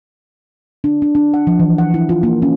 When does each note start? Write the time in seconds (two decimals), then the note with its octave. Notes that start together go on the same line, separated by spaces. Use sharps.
0.84 D4
1.02 D4
1.15 D4
1.34 F#5
1.47 F3
1.59 E3
1.78 F#5
1.94 E4
2.09 F4
2.23 A#3
2.42 C#4